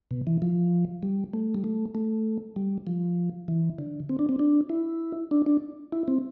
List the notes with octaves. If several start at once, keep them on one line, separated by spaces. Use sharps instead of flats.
B2
E3
F3
G3
A3
G3
A3
A3
G3
F3
E3
D3
C4
D4
C4
D4
E4
D4
D4
E4
C4